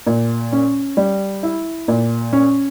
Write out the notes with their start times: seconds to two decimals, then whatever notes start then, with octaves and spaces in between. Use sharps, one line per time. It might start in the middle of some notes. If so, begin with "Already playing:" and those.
0.07 A#2
0.52 C#4
0.97 G3
1.43 E4
1.88 A#2
2.33 C#4